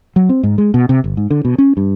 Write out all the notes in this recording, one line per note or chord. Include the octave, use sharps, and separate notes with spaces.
F#3
C4
G#2
G#3
B2
C3
G1
G#2
D3
B2
C#4
G2